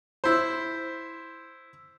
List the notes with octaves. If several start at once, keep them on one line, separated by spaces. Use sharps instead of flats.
E4 C5